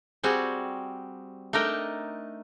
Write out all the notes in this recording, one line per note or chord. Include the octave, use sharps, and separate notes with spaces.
G3 C4 F#4 G#4
A3 D4 D#4 A#4 D#5 G5